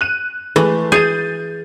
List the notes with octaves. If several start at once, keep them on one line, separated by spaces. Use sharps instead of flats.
F#6 D#7
E3 G#3 A3
G#4 G6 A6 D#7